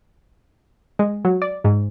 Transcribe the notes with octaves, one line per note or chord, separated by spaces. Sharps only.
G#3
F#3
D5
G#2